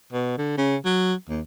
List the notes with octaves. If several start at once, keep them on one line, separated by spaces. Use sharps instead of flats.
B2
D3
C#3
F#3
D#2